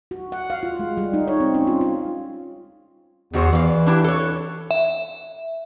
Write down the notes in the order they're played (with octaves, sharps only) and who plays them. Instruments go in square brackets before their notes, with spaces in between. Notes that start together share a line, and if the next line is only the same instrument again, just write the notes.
[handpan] F#4
F#5
F5
F4
G#3
G3
D#4
C#5
C4
C#4
F4
F4
[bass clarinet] E2 [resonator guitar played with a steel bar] D#3 F#4 C5
[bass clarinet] E3 [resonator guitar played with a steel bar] D5 F5
[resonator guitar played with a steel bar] D4 E4 G4
A4 C#5
[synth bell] E5